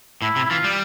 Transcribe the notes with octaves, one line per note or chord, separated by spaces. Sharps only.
A2 E4
C3
E4
E3 F4
G3